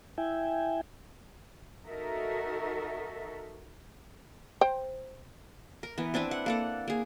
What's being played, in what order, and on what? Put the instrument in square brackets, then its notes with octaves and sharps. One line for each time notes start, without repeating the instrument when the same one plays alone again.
[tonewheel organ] E4 E5 G5 G#5
[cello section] D#4 F#4 A4 A#4 E5
[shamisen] C5 G5
[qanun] A#4
E3 B3
C4 D4 E4 B4
F#5
A#3 A4 F#5
A#3 G#4